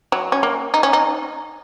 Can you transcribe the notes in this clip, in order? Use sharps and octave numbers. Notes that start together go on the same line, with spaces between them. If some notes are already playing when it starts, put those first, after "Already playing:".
F#3
C#4
A#3
D#4
C#4
D#4